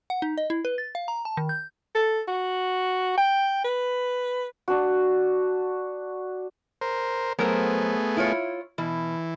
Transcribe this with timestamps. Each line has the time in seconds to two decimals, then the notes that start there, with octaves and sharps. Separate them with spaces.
0.10 F#5
0.22 D#4
0.38 D#5
0.50 E4
0.65 B4
0.78 A6
0.95 F5
1.08 A#5
1.25 A5
1.37 D#3
1.49 G6
1.95 A4
2.28 F#4
3.18 G5
3.64 B4
4.68 D4 F#4
6.81 A#4 C5
7.39 F#3 A3 B3 G#4 A#4 C5
8.17 E4 F4 C#5
8.78 B2 E3